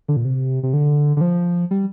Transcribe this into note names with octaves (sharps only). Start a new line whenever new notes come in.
D3
A#2
C3
C3
D3
D3
F3
G3